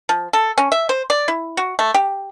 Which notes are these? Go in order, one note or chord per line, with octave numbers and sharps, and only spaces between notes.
F3
A4
C#4
E5
C5
D5
E4
F#4
A3
G4